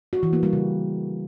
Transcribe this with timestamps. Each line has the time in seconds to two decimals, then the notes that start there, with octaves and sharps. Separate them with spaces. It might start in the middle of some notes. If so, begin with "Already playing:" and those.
0.13 F#4
0.23 E3
0.33 A#3
0.43 G3
0.53 C#3